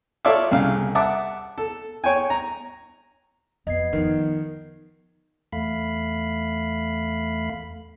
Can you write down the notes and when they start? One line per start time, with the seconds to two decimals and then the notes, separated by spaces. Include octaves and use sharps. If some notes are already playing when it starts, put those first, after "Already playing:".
0.25 F4 A4 C#5 D5 E5 F5
0.51 C2 C#3 F5
0.95 E5 F#5 A5 D6
1.58 A4
2.04 C#5 G5 G#5
2.30 A#5
3.67 F2 B3 D#5 G#6 C7
3.93 D#3 F3
5.53 E2 A3 F5 B5